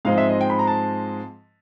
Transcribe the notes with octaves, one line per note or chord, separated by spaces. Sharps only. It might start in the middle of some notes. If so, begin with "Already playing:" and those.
G#2 F3 G#3 C4 F5
E5
D#5
G5
B5
A#5
A5